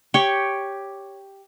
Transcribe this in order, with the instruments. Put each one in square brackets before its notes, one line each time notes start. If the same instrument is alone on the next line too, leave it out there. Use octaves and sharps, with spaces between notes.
[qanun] G4 C#5 G5